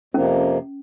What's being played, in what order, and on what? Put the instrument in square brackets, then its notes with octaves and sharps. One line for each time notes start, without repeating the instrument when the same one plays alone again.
[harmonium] F2 C3 F3 A#3 [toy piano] C#4